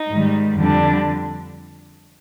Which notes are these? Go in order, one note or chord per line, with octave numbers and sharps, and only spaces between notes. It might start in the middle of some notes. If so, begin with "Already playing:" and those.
Already playing: D#4
G#2 D#3 G3
F2 D3 G3 D4